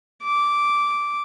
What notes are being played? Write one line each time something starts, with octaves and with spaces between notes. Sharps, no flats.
D6